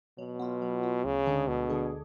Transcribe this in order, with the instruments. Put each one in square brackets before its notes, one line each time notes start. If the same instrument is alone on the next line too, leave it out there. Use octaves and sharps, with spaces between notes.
[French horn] B2 [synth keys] F#3
[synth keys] B3 F4
F#3
B3 F4
[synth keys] D2 [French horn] C#3
[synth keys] D3 G#3 D4 G#4
[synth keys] D2 [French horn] B2
[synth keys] D3 G#3 D4 G#4